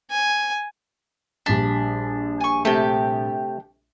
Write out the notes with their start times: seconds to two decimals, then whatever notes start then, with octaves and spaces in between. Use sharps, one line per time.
0.11 G#5
1.46 A#1 G3 D4 B6
2.40 G#5 C#6
2.65 C3 A3 G4 G5 A5